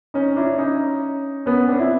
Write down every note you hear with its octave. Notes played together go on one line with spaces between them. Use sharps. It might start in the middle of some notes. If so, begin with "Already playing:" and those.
C#4 D#4
D4 E4
C#4 D#4
B3 C#4
C4 D4
E4